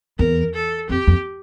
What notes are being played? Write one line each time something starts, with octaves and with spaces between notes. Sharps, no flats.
E2 A#4
A4
F2 G4
F2